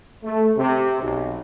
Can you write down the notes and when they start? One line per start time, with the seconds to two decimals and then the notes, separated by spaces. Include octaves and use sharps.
0.25 A3
0.57 C3
1.02 B1